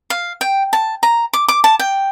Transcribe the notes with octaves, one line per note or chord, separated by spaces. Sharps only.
F5
G5
A5
A#5
D6
D6
A5
G5